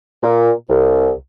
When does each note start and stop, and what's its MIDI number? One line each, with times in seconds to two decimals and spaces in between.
0.23 0.51 46
0.70 1.11 36